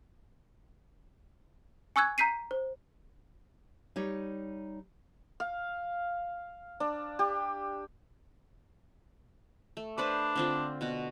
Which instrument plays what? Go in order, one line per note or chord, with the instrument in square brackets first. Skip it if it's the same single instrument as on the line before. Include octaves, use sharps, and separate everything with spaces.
[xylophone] G#5 C#6 E6 F#6 G#6
A#5 G6 B6 C7 D#7
C5
[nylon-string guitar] G3 D#4 C#5
[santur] F5
D4
G4
[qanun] A3
[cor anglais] D4 [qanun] B4 C5 D5
[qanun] D3 C4 F4
B2 F#4